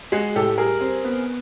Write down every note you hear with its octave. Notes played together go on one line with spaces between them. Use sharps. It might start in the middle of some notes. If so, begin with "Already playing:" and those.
G#3 F#4 G#4
A2 G4 A4
G3 G#4 A#4
C4
B3